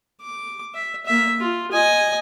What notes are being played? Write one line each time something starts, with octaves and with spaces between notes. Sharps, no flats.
D6
E5
A#3 E5
F4
D#5 G#5